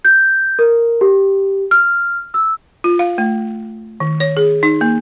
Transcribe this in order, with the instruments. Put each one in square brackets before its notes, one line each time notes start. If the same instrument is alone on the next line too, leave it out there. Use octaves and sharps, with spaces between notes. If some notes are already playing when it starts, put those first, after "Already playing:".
[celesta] G6
A#4
G4
F6
E6
[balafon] F4
F5
A3
D#3
C#5
G#4
D#4
A#3